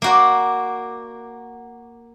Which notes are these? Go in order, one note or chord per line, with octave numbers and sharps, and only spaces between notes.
A#3 F#4 D5